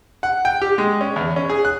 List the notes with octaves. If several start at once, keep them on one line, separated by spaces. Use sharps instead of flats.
F#5
G5
G4
G#3
C#4
E2
C#4
G#4
F#6